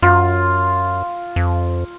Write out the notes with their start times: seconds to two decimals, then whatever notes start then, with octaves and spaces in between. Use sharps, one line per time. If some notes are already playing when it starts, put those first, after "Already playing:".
0.02 F#2 F4
1.36 F2